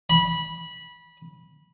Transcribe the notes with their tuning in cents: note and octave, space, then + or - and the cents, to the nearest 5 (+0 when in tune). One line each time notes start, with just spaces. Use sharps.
B5 -20